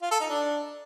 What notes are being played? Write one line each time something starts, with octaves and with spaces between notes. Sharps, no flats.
F4
A4
D#4
D4